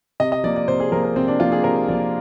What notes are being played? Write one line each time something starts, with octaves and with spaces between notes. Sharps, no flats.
C3 D#5
D#5
F3 A#3 D5
D5
C3 C5
G#4
F3 A#3 A#4
A#4
C3 C4
D4
F3 A#3 F4
G#4
C3 A#4
F3 A#3 D5